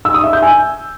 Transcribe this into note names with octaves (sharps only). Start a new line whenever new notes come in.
E6
D#6
E5
G6
G#5